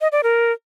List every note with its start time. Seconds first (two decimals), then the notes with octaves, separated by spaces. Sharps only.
0.01 D#5
0.12 D5
0.23 A#4